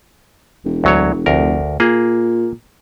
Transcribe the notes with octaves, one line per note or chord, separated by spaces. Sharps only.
E1
D2 F#3 C#5
F1 D2 A#4
A#2 A#3 G#4